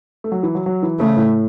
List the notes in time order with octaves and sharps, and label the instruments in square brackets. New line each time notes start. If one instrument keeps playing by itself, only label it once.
[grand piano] A3
F#3
E3
F#3
F#3
E3
[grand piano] C#3 [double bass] A3
[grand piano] A2